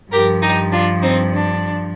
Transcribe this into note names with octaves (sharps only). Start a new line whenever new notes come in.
G2 F3 G4 A#4
D#4 G4
D4 F4
C4 D#4
D4